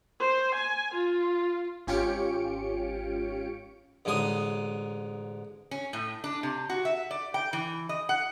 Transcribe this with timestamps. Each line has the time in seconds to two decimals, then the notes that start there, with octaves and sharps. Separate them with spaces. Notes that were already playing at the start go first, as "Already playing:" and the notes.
0.20 C5
0.55 G#5
0.94 F4
1.87 G#1 C#4 F4 G4 C#7 D7
4.05 A1 G#2 D3 G#5 D#6
5.71 C#4
5.93 A2
6.24 D4
6.43 C3
6.69 F#4
6.85 E5
7.11 D5
7.34 G5
7.53 E3
7.89 D#5
8.09 F#5